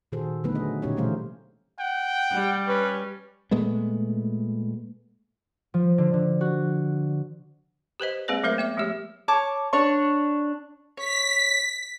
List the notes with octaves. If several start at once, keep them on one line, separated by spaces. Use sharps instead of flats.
A#2 D#3 F#4 G#4 A4 C5
D3 F#3 A3 B3 D#4 B4
G#4 D#5
A#2 D3 C#4 D#4 G4 C#5
B2 E3 G3 A3 C5 F5
F#5 G5
G3
C#4 B4
A#2 G#3 A3 B3
F3
D3
D3
F#4
G4 B4 C5 D#5
G#3 A#3 C4 G#4 B4 D5
F#3 A3 A#4 C5 F5
B3 E5 D6
F3 G#3 A3 G4
C#5 A5 D6
D4 C#5 C#6
C#5 B6